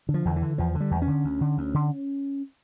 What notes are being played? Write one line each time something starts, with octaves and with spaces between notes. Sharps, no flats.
D3
F3
E2 D3
E3
D3
E2 F3
D3
G3
E2
C#4
D3
D2
D3
D2
D3